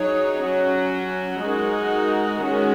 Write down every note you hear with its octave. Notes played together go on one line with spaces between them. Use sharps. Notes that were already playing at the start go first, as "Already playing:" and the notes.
Already playing: F#3 D#4 G#4 C#5
F#3 C#4 F#4
G#3 D#4 F#4 A#4
D#3 G#3 C#4 F#4